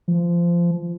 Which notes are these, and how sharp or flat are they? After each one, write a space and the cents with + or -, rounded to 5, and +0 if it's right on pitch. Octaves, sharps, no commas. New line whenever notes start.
F3 -20